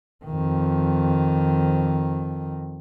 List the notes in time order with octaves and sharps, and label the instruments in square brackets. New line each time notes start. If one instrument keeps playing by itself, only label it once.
[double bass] F2 D#3